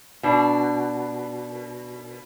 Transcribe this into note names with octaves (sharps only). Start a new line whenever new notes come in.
B2 D4